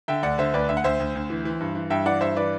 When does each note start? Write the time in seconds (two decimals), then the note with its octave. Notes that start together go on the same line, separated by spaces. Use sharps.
0.08 D3 E5 G5
0.23 D2 D5 F#5
0.38 D3 C5 E5
0.54 D2 B4 D5
0.69 D2 E5
0.77 F#5
0.84 D2 C5 E5
1.00 D2
1.15 D2
1.30 E3
1.45 E3
1.60 G2
1.75 E3
1.90 G2 E5 G5
2.06 E3 D5 F#5
2.21 G2 C5 E5
2.36 E3 B4 D5